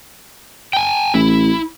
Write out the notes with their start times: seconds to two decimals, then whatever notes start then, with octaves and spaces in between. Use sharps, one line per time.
0.73 G5 G#5
1.14 A1 E4